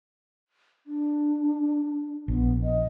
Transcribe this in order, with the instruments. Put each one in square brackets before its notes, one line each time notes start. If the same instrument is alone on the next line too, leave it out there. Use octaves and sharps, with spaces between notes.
[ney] D4
[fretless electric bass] A#1 [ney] B3
[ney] D#5